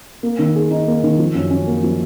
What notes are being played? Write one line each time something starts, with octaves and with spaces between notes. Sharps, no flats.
A#3
D#3
G#4
D#4
A#3
D#3
F3
F#2
C#4
A#3
F3